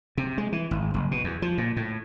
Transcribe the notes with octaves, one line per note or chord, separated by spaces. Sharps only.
C3
G#3
E3
G#1
F#1
B2
E2
F3
A#2
A2